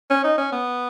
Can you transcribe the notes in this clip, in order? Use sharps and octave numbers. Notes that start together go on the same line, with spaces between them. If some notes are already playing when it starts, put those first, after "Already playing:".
C#4
D#4
C#4
B3